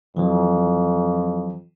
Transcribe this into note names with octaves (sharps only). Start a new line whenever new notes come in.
F2 E3 F#3